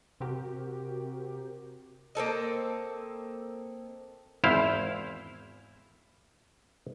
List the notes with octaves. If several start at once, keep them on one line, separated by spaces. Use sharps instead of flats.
C3 C4 F#4 G4 A#4
A#3 C4 A4 D#5
G#1 E2 E4 C5 F5